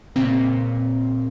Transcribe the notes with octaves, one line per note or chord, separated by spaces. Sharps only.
A#2 C#3 C4